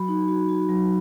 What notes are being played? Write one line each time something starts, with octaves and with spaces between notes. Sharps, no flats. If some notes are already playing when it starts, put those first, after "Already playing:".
Already playing: F#3 F#4 B5
D#4
F#4
F#4
F#3